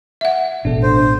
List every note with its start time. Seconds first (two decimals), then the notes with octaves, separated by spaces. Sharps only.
0.21 E5 F#5
0.65 A1 B2 D4 A4
0.83 C5